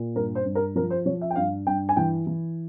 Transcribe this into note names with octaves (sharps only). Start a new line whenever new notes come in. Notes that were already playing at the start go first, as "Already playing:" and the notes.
Already playing: A#2
G2 A#4
C5
G2
A#4
F3 A#4
C5
F3 C#5
E5
G5
G2 F5
G2 G5
G#5
E3 G5
E3